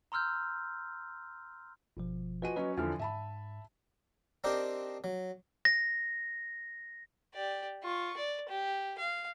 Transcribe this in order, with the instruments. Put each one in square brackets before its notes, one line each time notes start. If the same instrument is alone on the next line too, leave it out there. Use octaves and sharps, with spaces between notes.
[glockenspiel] A#5 C6 E6 F6 G6
[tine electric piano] G1 B2 F3
[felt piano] F3 F#4 D#7 [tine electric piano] B4 D#5 G#5
[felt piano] F#3 C#4 [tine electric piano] B4 D#5
[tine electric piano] E2 F6 [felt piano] D3 E3 F3
[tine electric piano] G#2 [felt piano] E5 A5 B5
[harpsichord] C4 D4 D#4 G4 A#4 C5
F#3
[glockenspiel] A#6
[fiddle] G4 D5
F4 C#6
D5
G4
F5